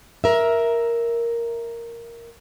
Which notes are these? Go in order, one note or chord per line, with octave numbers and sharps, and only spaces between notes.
A#4 E5